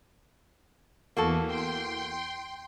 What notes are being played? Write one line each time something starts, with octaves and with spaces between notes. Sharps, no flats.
E2 E3 A#3 F#4 A4
G5 C6